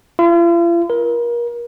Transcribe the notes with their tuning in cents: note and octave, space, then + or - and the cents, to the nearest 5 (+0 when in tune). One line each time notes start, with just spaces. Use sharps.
F4 -45
A#4 +30